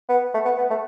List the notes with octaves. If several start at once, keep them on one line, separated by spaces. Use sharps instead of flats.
B3
A3
B3
B3
A3